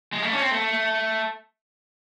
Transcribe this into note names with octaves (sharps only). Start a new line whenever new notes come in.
G#3
A3
C#4
C4
A3